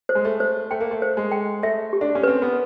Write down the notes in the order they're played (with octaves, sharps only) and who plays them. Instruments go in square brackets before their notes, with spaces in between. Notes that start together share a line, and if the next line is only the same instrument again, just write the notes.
[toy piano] C5
[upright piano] G#3
A3
[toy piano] C5
[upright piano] A3 [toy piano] G5
[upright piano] A#3
A3
[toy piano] C5
[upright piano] G#3
[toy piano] G5
[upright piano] A3 [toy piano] E5
[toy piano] G4
[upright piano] D4
C#4
[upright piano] C4 [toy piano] B4
[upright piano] B3